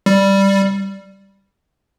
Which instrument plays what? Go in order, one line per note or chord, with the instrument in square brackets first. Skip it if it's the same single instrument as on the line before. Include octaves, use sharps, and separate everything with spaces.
[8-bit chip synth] G3